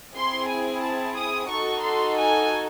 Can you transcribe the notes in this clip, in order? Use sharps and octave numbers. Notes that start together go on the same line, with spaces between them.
C4 E4 G#4 C6
G#5
A5
D#6
D#4 F#4 A4 C#6
C6
G#5